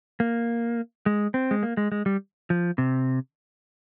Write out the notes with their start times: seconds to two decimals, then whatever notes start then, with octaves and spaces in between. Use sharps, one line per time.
0.20 A#3
1.06 G#3
1.34 C4
1.51 G#3
1.63 A#3
1.77 G#3
1.92 G#3
2.06 G3
2.50 F3
2.78 C3